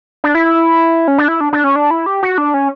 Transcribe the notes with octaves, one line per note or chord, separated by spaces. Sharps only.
D4
E4
C#4
D4
E4
D4
D4
C#4
D4
E4
G4
F#4
D4
C#4